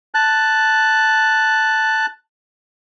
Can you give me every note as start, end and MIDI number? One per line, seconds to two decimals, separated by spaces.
0.14 2.06 81
0.14 2.06 90